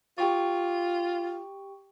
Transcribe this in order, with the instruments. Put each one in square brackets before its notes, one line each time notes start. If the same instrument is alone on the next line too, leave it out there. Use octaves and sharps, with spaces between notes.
[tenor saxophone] F4 [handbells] G4 G5 C#6